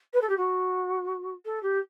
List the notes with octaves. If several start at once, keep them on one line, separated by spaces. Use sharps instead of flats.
B4
A4
G4
F#4
A4
G4